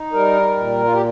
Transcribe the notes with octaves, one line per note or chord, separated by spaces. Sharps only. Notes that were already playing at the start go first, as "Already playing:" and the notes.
Already playing: D#4
G3 A#4
A#2
F4
G4